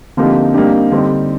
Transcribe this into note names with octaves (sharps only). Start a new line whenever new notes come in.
D3 F3 A#3 C4 D#4 G4
G3 A#3 D4 D#4 G4
D3 G3 C4 D#4 G4